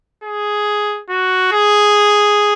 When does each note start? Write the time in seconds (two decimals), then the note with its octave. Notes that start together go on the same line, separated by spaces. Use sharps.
0.24 G#4
1.09 F#4
1.52 G#4